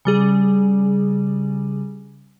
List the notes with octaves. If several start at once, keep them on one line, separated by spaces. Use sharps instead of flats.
C#3 G3 G#4